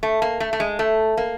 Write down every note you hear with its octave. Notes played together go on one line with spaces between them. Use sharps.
A3
A#3
A3
A3
G#3
A3
A#3